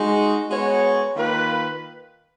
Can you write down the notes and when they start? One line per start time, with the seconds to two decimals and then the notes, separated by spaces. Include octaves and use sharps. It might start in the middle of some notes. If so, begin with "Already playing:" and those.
Already playing: G#3 D#4 F#4
0.51 G#3 B3 F#4 C#5
1.16 D#3 A#3 F4 B4